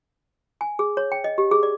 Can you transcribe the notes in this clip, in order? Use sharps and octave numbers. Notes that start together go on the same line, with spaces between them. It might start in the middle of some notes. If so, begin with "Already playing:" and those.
G#5
G#4
C#5
G5
D#5
G4
G#4
D5